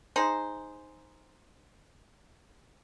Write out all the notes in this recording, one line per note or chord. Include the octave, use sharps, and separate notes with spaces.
D#4 G#4 C5